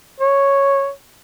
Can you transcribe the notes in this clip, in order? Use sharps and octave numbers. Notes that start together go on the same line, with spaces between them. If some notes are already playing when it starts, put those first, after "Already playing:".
C#5